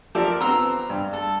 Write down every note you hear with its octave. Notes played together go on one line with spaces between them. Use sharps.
F3 G4 A4 A#4 D5
B3 C4 A#5 C6 E6
G2
A4